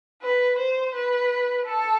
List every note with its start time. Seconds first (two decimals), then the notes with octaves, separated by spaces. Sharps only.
0.22 B4
0.59 C5
0.94 B4
1.66 A4